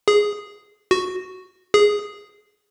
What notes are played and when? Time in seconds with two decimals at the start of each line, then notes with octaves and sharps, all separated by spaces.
0.08 G#4
0.91 F#4
1.74 G#4